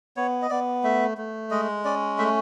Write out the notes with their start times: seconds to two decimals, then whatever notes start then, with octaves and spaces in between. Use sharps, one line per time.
0.17 B3 C#5
0.42 D#5
0.50 B3 D5
0.84 A3 E5
1.18 A3
1.51 G#3 D#5
1.85 C#4 D5
2.19 A3 E5